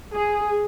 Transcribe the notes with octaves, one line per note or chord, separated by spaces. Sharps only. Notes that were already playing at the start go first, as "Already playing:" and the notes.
G#4